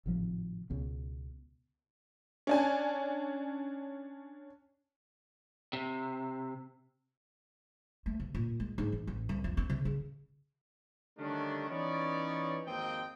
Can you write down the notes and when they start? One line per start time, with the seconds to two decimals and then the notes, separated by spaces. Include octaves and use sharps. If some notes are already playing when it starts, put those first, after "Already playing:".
0.06 G#1 A2 C3 F3
0.70 C#2 B2
2.47 C#4 D4 G#5
5.73 C3
8.06 A3
8.20 C3
8.35 A#2
8.60 G#3
8.78 G#2
8.92 E3
9.07 A1
9.29 C2
9.44 F2
9.57 C4
9.70 C3
9.85 C#3
11.18 D3 D#3 G3 A3 C#4 D4
11.69 E3 B3 C#4 D#4 C#5 D5
12.66 G#1 F2 A#3 C4 D#5 G5